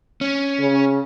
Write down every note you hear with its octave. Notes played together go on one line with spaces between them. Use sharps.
C#4
C#3